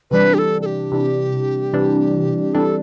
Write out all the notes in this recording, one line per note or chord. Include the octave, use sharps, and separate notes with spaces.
C3 E3 G3 D4 B4
G4
A4
A4
G4
C3 E3 G3 D4
C3 E3 G3 D4
C3 E3 G3 D4 A4